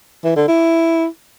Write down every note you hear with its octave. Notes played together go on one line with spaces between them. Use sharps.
E3
D3
E4